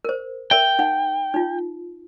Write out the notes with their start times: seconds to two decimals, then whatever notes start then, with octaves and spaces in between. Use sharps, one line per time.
0.05 A#4 C5
0.51 A#4 E5 G5
0.79 D#4 F#5
1.34 D#4 F4